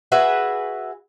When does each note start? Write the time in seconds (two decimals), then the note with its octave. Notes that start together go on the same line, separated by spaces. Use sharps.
0.12 F#4 G#4 B4 E5